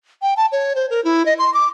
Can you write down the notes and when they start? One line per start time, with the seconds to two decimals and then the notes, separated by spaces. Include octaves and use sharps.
0.22 G5
0.37 A5
0.52 C#5
0.75 C5
0.90 A#4
1.05 E4
1.26 D#5
1.39 C6
1.54 D6